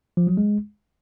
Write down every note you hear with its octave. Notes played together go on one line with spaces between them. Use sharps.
F3
F#3
G#3